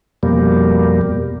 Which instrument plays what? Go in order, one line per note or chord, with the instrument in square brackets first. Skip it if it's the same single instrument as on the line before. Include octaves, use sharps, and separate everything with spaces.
[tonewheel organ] F2 B2 G3 A#3